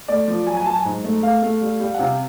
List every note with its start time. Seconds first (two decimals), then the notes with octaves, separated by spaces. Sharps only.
0.08 A3 D5
0.28 F3
0.47 F#3 G#5
0.57 G#5
0.66 F#3 A5
0.75 G#5
0.85 G#2
1.04 A3
1.22 A3 F5
1.42 A3
1.61 G3
1.80 G3
1.94 F#5
1.99 C3 F5